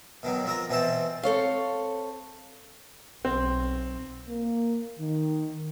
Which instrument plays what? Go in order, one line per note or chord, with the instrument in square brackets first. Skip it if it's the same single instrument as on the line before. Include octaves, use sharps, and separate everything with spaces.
[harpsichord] B2 D#3 F#3
F3 C4 A#4
B2 E3 C4 C5 A5
[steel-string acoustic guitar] C4 A4 C#5 F5
[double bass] B1 [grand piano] C4
[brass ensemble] A#3
D#3